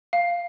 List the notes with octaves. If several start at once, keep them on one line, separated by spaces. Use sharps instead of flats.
F5